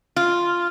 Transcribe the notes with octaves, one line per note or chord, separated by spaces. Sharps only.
F4